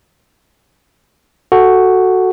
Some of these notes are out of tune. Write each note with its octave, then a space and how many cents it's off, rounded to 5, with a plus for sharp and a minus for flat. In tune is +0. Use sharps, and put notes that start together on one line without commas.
F#4 +0 A4 +0